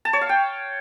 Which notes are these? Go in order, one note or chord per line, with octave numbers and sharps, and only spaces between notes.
A5
C#5
F5
G5